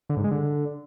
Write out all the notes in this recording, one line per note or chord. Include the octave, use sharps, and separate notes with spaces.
D3
G#2
G#3
D3